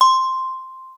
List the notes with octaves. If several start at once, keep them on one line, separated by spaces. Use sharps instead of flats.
C6